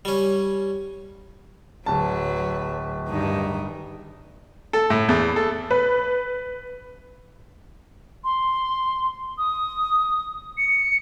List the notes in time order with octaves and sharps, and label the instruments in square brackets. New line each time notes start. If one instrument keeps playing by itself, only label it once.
[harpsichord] G3 C#4
[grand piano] D1 A5 [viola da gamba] F#3 B4
[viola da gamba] G2 D#3 D#4
[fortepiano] A4
A2
E2
A4
[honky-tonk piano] B4
[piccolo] C6
D#6
C#7